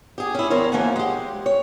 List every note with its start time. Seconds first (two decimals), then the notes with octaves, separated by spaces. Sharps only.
0.18 G4 G#4
0.35 C#4 E4
0.50 E2 A#4 C5 C#5
0.72 D2 E3 F3 A#3 F#5 G#5
0.96 G#3 G4
1.46 C#5